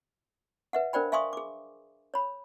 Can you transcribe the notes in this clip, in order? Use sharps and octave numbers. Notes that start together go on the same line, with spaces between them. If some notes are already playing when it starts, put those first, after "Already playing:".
B4 E5 F#5
D4 A#4 C5 D5 G5 B5
E5 F5 G#5 C6 C#6 D#6
G#4 D6
C#5 B5